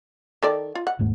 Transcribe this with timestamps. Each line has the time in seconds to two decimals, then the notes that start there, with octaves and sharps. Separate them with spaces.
0.43 D#3 A4 D5
0.75 F4
0.87 F#5
0.99 D#1 G#2 A3